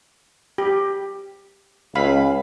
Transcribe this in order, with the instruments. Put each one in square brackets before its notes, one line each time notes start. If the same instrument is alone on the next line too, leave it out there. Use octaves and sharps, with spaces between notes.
[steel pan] G4
[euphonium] C#2 [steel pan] F5 B5